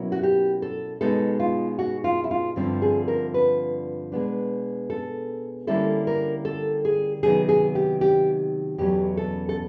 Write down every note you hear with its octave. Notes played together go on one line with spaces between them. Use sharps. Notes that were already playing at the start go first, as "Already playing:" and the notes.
Already playing: B2 F#3 A#3 C#4 E4
F#4
G4
A4
B2 G#3 B3 D#4 A4
F4
F#4
F4
E4
F4
G2 D3 F3 A3 C4
G#4
A#4
B4
B2 G#3 B3 D4
A4
D3 G3 A#3 C#4 E4 A4
A#4
A4
G#4
C3 D#3 F#3 B3 D#4 G#4
G#4
G4
G4
E2 B2 F#3 A3 C#4 G4
A4
A4